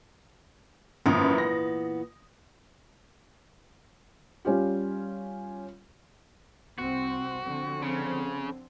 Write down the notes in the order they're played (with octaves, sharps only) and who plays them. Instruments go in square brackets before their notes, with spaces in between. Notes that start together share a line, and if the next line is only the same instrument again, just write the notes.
[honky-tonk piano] G#1 F#2 D#6 [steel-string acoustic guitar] A#2 E3 B3
[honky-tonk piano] A#6
[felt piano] G3 C#4 F4 G4
[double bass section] C2 C4 [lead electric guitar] F#4
[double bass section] D3 F3 C4
[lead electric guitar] C#3